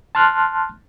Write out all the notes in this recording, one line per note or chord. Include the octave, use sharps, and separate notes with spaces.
A5 C6 F6 F#6